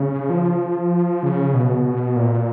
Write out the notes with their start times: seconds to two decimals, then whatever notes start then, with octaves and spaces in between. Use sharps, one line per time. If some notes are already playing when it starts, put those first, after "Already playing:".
Already playing: C#3
0.30 F3
1.23 C#3
1.54 B2
1.85 B2
2.16 A#2